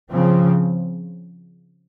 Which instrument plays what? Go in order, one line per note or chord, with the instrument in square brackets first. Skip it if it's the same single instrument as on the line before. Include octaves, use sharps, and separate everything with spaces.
[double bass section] C#3 F3 C4